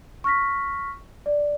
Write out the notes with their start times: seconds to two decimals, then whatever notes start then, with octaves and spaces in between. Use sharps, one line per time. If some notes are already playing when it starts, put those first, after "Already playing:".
0.24 C#6 F6 A#6 B6
1.26 D5